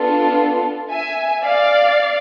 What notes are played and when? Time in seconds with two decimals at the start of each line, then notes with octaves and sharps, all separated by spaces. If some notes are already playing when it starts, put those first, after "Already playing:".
Already playing: B3 D4 F4 A4
0.92 E5 G#5
1.45 D5 F5